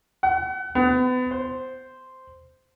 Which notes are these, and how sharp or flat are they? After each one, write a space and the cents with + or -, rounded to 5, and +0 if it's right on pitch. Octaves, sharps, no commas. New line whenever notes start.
F#5 +35
B3 +35
C5 -5